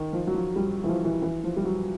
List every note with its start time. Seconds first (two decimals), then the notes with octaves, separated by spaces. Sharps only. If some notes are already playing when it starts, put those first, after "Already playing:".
Already playing: D#3
0.13 F3
0.27 F#3
0.34 F3
0.56 G3
0.84 E3
0.89 F3
1.04 E3
1.22 E3
1.44 F3
1.57 G3
1.64 F#3